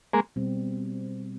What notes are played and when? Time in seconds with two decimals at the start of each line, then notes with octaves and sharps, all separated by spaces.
0.13 G#3 A#3
0.36 B2 G3 C4